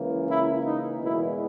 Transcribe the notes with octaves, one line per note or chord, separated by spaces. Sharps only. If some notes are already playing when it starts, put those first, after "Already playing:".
Already playing: C#2 C#3 E3 A#3
E4
D#4
E2 B2 G#3 B3 E4